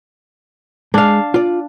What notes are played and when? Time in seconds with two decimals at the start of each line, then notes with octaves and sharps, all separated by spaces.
0.94 G#3 D4 F5
1.34 F4 D5